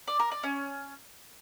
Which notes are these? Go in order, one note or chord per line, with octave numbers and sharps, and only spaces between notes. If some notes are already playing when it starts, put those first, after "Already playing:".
D5
A#4
D5
C#4